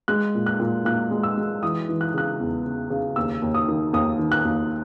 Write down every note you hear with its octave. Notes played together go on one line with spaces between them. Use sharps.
G#3 F#6
A#2
F#6
A#2
A#2 F#6
G#3
E6
G#3
E3 D#6
E3
F#6
C#3 F#6
E2
C#3
C#3
D#2 E6
D#2
D#6
D#3
D#2 D#6
D#3
F#6
D#2